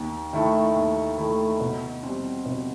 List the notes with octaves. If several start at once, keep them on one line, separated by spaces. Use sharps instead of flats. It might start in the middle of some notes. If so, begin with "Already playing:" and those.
Already playing: D#2
D#3 A3 E4 A4
D#2
D#3 A3 E4 A4
B2
G3 C4
B2